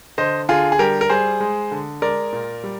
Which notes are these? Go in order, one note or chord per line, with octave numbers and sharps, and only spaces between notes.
D3 C5 D#5
D3 F4 G#4
G#4
G3 G4 A#4
A#4
G3 G#4 C5
G#3
D3
G#3 A#4 D5
A#2
G3